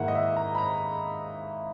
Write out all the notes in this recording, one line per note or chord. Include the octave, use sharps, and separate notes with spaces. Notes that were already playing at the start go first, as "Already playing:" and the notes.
Already playing: G#2 D#3 A#3 E4 E5 F#5
D#5
E5
A#5
B5
A#5